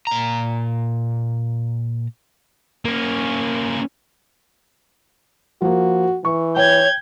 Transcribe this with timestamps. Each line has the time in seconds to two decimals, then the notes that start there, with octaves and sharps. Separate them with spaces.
0.07 A#2 A#5
2.85 A#3 C#4
5.62 F3 A#3 F#4
6.25 E3 C#6
6.57 C#5 G5 G6 G#6